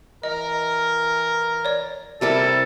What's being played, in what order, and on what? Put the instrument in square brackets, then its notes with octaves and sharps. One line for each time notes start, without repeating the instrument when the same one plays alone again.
[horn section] E3 A#4 [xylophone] D#5
[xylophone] C#5 D5
[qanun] C3 G3 A#4 [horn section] E4 [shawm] A4